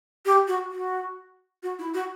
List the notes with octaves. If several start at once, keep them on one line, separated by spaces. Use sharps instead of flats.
G4
F#4
F#4
F#4
E4
F#4